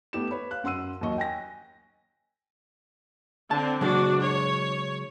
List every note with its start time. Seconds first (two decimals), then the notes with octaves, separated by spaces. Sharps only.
0.13 A3 B3 G4 E7
0.31 B4 C#5 B5
0.51 F5 F#6
0.64 F#2 F#5 C6 E6 D#7
1.01 D#2 F#3 D#5 C#6
1.18 G5 G#5 A#6
3.51 D3 C4 A5
3.81 C#3 F#3 G#3 D4 F#4
4.22 C#5